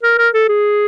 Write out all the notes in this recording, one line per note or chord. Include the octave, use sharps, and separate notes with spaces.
A#4
A#4
A4
G#4